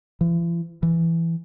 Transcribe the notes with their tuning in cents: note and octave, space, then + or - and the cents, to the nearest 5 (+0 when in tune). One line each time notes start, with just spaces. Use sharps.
E3 +45
E3 +10